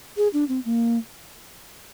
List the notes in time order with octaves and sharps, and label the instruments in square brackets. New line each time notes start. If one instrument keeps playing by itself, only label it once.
[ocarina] G#4
D4
C4
A#3